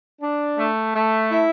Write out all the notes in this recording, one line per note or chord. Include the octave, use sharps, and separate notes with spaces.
D4
A3
A3
E4